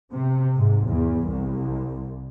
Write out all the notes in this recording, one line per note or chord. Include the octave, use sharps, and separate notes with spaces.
C3
G#2
E2
C2